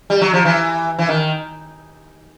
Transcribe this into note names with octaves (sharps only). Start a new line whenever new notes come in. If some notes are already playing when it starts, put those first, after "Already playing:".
G3
F#3
F3
E3
E3
D#3